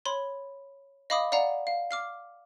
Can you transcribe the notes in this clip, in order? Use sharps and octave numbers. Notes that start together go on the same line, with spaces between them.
C#5 B5 C6
D#5 F5 B5 D6 D#6
D5 F5 F#5 A#5
F5
D6 F6 C7